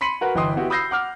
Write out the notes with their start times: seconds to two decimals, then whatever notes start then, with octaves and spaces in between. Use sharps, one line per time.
0.01 B5 C6 B6 C#7 D#7 F#7
0.21 F#4 A#4 B4 F#5
0.35 G1 E3 D#5 G5 C6 D#6
0.56 B3 E4 F#4 G4
0.70 B5 D#6 E6 G6 A#6 C7
0.91 F#5 D6 F6